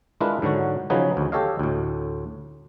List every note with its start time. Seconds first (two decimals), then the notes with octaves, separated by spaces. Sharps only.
0.21 G#3 D4 E4 F4 A#4 B4
0.42 G#2 D3 F#3 F#4
0.90 C#3 F3 F#3 D#4 G#4 B4
1.17 D2
1.32 G4 A4 C#5 D#5 F5
1.59 D2 A2